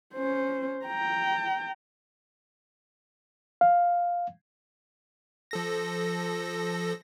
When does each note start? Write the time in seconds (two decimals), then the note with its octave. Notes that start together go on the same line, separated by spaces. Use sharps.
0.14 C#4 C5
0.85 G5 A#5
3.61 F5
5.51 F3 A4 A#6